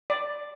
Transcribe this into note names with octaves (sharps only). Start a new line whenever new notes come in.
D5